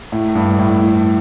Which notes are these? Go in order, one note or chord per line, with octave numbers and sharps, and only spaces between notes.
A2
G2
A2
A2